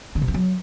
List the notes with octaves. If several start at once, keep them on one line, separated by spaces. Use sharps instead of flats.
D3
C3
E3
F#3